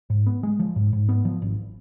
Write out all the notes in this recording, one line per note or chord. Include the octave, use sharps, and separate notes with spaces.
G#2
B3
G#3
F3
G#2
G#2
B3
F3
G#1